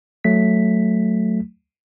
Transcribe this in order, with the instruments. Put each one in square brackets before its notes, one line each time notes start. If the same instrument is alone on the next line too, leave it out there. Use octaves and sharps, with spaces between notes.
[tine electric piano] F#3 A3 B6